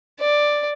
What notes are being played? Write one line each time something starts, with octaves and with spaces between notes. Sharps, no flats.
D5